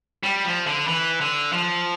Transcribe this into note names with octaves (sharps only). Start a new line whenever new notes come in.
G3
F3
D3
E3
D3
F3